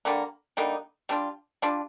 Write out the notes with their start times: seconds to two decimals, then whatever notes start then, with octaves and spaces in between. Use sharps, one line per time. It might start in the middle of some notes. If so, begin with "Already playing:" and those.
0.05 D3 G3 A#3
0.57 D3 G3 A#3 D#4
1.09 G3 D4 F4
1.62 G3 D4 F4